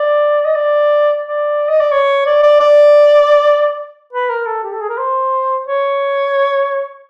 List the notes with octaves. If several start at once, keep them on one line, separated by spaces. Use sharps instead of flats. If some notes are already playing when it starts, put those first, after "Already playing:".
Already playing: D5
D#5
D5
D5
D#5
D5
C#5
D5
D5
D5
B4
A#4
A4
G4
A4
G#4
A#4
C5
C#5